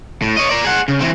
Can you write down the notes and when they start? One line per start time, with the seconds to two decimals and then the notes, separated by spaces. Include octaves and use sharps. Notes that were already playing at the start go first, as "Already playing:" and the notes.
0.22 A2
0.37 C#5 D#5
0.49 A#4 D5
0.65 G#4 F#5
0.88 C#3
1.00 E3 C4